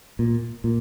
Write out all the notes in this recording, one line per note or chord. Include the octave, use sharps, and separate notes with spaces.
A#2
A#2